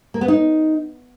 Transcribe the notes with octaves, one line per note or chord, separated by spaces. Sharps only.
A#3
B3
D#4